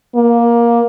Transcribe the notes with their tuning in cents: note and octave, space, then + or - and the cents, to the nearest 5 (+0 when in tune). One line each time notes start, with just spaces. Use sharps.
A#3 +15